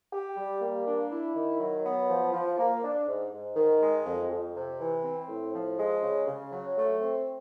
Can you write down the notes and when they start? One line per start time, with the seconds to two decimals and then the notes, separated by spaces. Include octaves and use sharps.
0.12 G4
0.37 G3
0.61 A#3
0.86 D4
1.10 E4
1.34 D#3
1.60 F#3
1.84 B3
2.09 F3
2.33 F3
2.58 A#3
2.82 D4
3.07 G#2
3.32 G#2
3.56 D#3
3.81 G#3
4.06 F2
4.30 F2
4.55 C3
4.79 E3
5.03 C4
5.28 A2
5.53 F3
5.77 G#3
6.02 C#3
6.27 C#3
6.51 F#3
6.76 A3
7.00 C4